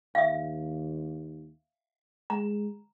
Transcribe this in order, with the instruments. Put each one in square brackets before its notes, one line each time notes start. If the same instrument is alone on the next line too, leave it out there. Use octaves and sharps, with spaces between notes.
[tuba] D#2 [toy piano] E5 F5
[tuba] G#3 [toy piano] A#5